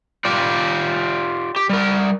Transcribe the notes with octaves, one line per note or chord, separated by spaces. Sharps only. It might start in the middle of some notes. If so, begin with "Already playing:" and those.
F4 G4 D5
G4
G3 A#4